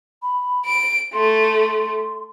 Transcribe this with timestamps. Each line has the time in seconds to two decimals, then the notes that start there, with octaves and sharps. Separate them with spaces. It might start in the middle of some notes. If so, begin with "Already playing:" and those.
0.22 B5
0.66 D7
1.13 A3 C6